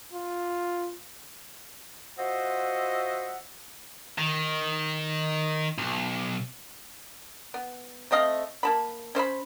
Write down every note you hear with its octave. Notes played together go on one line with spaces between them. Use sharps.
F4
F4 F#4 C5 D#5 E5 F#5
D#3
B1
B3
A3 C4 D#5 F5
A#3 A5 B5
C#4 C5 E5 B5